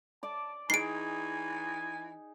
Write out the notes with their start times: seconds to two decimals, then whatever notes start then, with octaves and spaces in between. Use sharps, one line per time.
0.23 D5 A5 D6
0.70 E3 D#4 G#4 G#5 C7 D7